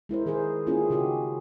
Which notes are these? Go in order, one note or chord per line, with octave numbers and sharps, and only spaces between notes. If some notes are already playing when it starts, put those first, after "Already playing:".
G#3 E4 A#4 C5
D#3 G#4 A#4 C5
A#3 C#4 E4 F4 G4 G#4
C#3 D#4 F#4 G4